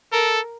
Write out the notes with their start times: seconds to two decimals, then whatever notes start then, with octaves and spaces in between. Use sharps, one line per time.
0.12 A4 A#4